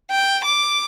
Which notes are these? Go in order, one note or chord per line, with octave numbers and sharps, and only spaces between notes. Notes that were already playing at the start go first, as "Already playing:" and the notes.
G5
D6